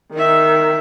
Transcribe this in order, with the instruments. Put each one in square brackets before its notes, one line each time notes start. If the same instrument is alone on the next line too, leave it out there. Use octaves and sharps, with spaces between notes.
[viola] D#3 [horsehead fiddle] D#4 E5